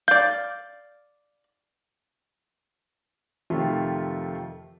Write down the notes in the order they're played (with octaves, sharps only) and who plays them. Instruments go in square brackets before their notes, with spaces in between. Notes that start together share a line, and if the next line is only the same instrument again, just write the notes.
[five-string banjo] D5 F5 [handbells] G6
[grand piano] F2 C3 D#3 A3 F4